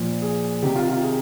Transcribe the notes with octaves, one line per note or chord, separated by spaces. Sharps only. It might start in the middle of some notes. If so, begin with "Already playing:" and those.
Already playing: A#2 F3
G#4
C3 D#3 G4
F4
F4
G#4